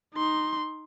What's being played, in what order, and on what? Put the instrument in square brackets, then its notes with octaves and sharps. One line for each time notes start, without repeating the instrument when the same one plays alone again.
[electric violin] D#4 C6